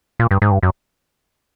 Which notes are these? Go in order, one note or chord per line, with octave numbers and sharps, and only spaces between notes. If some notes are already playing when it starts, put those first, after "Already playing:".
A#2
G2
G#2
G2
F#2